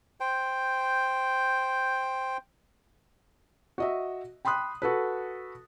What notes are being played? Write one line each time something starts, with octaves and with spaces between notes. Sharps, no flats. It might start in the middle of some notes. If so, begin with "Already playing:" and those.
C5 G5
F#4 D#5 E5
G5 B5 C6 D#6 F#6
F#4 A4 B4